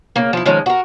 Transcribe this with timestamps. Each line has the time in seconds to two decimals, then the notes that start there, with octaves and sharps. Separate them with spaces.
0.16 C#3 A#3
0.33 F3 E4
0.46 D#3 F3 G#3 C#4
0.66 F#4 A#4